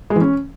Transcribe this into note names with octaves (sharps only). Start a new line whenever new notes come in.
G#3
E3
C#4